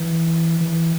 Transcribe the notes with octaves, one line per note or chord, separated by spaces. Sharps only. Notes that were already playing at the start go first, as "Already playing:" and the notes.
Already playing: E3
E3